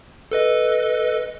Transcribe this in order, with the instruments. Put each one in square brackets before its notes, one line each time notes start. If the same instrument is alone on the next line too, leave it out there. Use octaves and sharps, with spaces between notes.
[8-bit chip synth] A4 B4 D#5